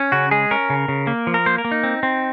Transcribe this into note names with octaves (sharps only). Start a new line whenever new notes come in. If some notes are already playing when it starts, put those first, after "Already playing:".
Already playing: C#4
C#3 F#4
G#3 G#4
C#4 A#4
C#3
C#3
A#3
F3
A#4
A#3 C5
A#4
A#3
D#4
C4
C4